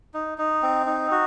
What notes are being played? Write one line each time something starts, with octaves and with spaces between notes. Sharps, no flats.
D#4
D#4
C4
D#4
F#4